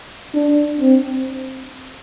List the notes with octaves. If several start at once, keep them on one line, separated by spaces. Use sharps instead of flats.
D4
C4